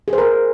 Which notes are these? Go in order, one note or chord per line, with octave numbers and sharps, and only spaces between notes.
G#4
C5
A#4